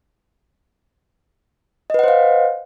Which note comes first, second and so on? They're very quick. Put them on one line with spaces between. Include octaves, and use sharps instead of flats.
D#5 B4 F#5 C5 F5